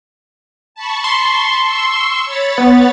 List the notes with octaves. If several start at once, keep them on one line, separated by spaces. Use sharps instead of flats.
A5 B5 C#6
C6
C#6 E6
C#5 B5 A6
B3